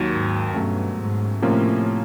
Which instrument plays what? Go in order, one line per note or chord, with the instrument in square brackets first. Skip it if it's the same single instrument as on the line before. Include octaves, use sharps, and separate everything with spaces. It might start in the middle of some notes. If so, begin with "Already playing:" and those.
Already playing: [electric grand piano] D#2 D#3 F#3
[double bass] G#2
[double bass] G2 [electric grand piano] B2 F#3 A3 C#4
[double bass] G#2
[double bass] A2 [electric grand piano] C3 F3 A#3 C#4 F4